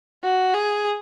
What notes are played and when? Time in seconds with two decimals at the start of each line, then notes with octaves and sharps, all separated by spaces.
0.23 F#4
0.54 G#4